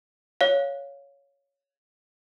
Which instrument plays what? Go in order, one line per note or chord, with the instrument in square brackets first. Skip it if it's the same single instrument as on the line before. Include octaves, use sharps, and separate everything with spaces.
[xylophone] C#5 F5